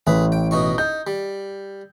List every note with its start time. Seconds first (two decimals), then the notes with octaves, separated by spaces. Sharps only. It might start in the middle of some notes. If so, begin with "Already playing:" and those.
0.07 A1 G#4 B4
0.32 G5
0.51 B2 D#4 C#6
0.78 D#4 G6
1.07 G3